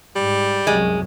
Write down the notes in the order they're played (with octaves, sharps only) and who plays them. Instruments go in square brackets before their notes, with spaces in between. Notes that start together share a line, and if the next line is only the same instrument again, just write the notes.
[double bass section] G#2 [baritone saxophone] G3
[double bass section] C2 F#2 [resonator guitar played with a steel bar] G#3